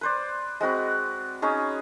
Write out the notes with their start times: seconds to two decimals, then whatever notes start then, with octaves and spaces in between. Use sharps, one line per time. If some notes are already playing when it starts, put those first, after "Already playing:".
0.01 B4 C5 D5
0.61 G#3 C4 F#4 B4
1.42 C#4 D#4 G#4 C#5